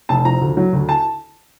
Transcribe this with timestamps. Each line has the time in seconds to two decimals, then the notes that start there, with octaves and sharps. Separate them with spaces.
0.09 F1 A5
0.25 F3 A#5
0.41 D2
0.57 F#3
0.73 D2
0.89 A5